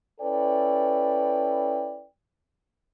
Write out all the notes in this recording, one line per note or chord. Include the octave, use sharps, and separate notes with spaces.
C#4 E4 A4 B4 D5 G5